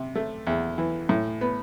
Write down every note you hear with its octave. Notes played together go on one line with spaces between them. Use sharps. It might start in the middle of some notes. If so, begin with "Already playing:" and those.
Already playing: C3
A3
E2
E3
A2
B3